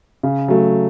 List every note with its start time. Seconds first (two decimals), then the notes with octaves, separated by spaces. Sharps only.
0.23 C#3
0.48 F#3 A3